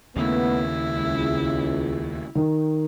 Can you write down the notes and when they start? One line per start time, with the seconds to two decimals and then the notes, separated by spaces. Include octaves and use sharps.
0.16 D#2 C#3 A3 B3 E4
0.90 C#2
2.35 D#3